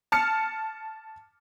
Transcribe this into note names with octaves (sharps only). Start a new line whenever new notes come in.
A5 F6 C#7